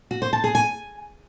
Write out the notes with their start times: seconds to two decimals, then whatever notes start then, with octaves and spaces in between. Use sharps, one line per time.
0.11 F#4
0.22 C5
0.33 A5
0.44 G#4
0.55 G#5